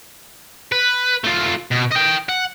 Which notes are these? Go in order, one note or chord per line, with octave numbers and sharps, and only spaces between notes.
B4
A3 F4
B2
D#5 G5
F#5